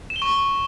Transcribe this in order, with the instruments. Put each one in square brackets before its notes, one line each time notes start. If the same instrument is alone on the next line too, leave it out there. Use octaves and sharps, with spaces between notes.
[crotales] E7
G7
C#6